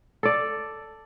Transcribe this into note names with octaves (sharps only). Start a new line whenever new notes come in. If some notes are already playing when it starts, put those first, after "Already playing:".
A4 D5